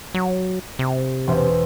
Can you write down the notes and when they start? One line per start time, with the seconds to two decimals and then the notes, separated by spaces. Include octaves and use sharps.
0.14 F#3
0.79 C3
1.27 E1 C5 E5